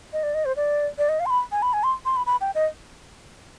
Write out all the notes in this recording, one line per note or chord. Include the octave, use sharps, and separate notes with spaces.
D#5
D5
D#5
C5
D5
D5
D#5
F5
C6
B5
G#5
B5
G#5
C6
C6
B5
B5
G5
D#5